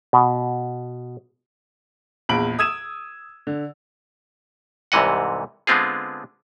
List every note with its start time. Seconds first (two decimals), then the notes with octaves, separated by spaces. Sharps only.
0.13 B2
2.29 A#1 E2 B5 D7 F#7
2.59 D#6 E6 G#6 D#7 E7
3.47 D3
4.92 C2 G#2 C3 E3 D#5 F#5
5.67 D3 G#3 B3 C4 F4 G#4